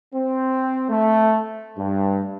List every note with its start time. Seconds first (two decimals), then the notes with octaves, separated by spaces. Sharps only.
0.13 C4
0.89 A3
1.76 G2